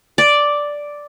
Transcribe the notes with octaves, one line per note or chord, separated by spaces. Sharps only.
D5